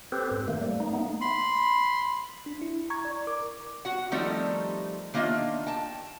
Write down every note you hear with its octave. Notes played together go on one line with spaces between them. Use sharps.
C4 G4 A4 B4 C5
G#2
D#3 A3 A#3
G3 A3
A#3 D#4
A3 B3 D#4
B5 C6
D4
E4
A#5 C#6 G#6
D5
A#4 D6
F#4 F#5
D#3 F3 G3 A3 C4 D#4
D#3 A#3 D4 F4 D#5 E5
G5 A5